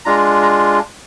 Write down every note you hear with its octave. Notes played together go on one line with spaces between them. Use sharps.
G#3 D4 F4 A#5
A#5